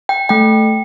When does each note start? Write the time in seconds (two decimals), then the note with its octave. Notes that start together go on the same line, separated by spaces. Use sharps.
0.09 G5
0.29 A3 G5